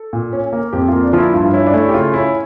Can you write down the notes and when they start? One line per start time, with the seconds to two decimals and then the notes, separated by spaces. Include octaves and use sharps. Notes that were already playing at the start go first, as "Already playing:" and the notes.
Already playing: A4
0.13 A#2
0.33 C#4
0.53 A#3
0.73 F2 G4
0.88 A#3 F4
1.03 D4
1.13 F3 F4
1.18 E4
1.33 G2 F4
1.45 F4
1.53 C#4 E4
1.67 D4
1.73 A3 E4
1.89 G4
1.94 C#3 F4
2.14 C#4 E4